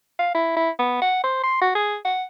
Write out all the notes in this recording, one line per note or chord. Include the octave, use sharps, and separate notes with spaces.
F5
E4
E4
B3
F#5
C5
C6
F#4
G#4
F#5